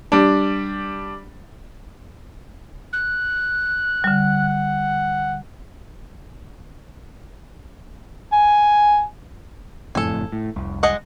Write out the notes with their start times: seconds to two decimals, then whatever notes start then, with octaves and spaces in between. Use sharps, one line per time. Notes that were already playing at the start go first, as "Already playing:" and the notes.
0.12 G3 D4
2.93 F#6
4.04 D3 G3 F#5
8.33 G#5
9.95 F#1 F2 A2 A4 G#5
10.32 A2
10.56 F1 C2
10.83 G#3 D#5 F#5